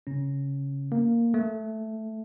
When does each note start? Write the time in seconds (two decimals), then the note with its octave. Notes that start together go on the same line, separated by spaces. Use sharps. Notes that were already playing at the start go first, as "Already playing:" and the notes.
0.07 C#3 C#4
0.92 A#3
1.34 A3